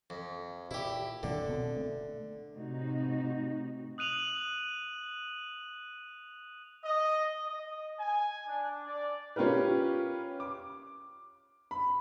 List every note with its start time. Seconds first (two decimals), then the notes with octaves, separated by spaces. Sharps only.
0.10 F2
0.71 A#2 E4 G4
1.23 A#2 D3 D#3 F#3
1.49 B2 C4
1.76 A3
2.56 A2 C3 D#4 F#4
3.98 D#6 F#6 D#7 F7 F#7
6.84 D#5
7.45 D#5
8.00 G#5
8.48 D4
8.87 D5
9.36 C#4 F4 G4 A#4 B4
10.40 D6
11.71 B5